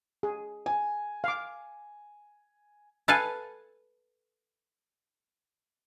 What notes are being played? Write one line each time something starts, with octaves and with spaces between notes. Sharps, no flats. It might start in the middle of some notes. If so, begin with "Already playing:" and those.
G#4
G#5
F5 D6
A4 B4 F5 G#5 A5